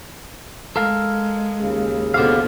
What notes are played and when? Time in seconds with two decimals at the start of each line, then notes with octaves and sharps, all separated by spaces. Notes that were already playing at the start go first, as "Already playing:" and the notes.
0.76 G#3 A4 A#4 F5
1.57 D#2 C#3
2.14 B2 D3 F3 F#4 G4 F5